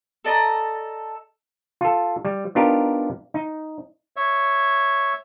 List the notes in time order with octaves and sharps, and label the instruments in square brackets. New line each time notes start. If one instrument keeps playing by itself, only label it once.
[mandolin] A4 D5 D#5 A#5
[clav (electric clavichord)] F4 A4
G3
B3 D4 D#4 F4 G4 A#4
D#4
[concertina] C#5 E5